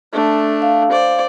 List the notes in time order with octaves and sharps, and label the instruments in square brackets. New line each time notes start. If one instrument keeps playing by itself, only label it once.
[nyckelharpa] A3 D4
[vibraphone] F5
[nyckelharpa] C5 D5